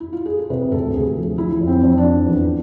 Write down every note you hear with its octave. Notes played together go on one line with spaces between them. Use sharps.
E4
F4
G#4
A4
C3 B4
D2 A4
D2 G#4
F3
F3 E4
F2
C4
F2
D4
F3
E2